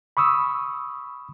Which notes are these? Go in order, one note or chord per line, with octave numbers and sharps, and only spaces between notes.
B5 C#6 D#6 E6